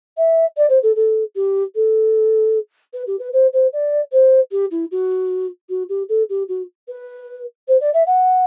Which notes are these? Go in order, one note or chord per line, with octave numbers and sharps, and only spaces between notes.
E5
D5
C5
A4
A4
G4
A4
B4
G4
B4
C5
C5
D5
C5
G4
E4
F#4
F#4
G4
A4
G4
F#4
B4
C5
D5
E5
F#5